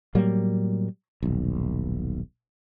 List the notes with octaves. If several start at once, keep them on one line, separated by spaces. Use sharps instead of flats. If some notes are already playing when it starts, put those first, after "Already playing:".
A2 F#3 G3 A#3
D#1 B1